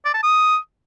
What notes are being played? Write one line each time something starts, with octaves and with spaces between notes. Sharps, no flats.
D5
A5
D#6